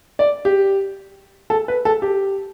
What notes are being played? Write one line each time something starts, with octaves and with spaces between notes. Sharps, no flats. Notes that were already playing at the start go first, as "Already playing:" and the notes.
D5
G4
A4
B4
A4
G4